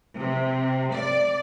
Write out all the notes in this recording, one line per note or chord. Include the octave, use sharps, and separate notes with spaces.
C3
D5